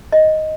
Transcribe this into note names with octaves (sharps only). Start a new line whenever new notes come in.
D#5